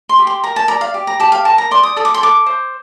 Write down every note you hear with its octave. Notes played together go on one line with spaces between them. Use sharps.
C6
G4
C6
A#4 A#5
A5
D5 A#5
F5
G4
A#5
G4 A5
F5
A#4 A5
A#5
D5 C6
D#6
A4 D#6
D6
C6
A4 D6
C5